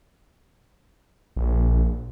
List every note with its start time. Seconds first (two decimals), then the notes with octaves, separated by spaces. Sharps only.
1.37 A#1